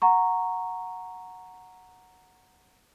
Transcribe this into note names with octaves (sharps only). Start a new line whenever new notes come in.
F#5 A#5 C#6